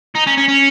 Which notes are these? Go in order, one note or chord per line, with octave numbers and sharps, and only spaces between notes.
D#4
C#4
C#4
C#4